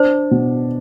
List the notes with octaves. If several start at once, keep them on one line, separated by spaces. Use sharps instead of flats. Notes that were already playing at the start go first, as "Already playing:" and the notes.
Already playing: D4 C5
B2